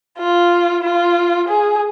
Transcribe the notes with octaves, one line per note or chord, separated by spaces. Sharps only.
F4
F4
G#4